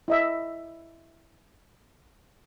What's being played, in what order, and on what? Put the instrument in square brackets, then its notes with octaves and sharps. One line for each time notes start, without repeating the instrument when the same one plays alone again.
[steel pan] E4 D#5 E5